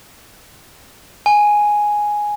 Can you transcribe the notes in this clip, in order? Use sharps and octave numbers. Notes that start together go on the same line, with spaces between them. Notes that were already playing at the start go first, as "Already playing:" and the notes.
G#5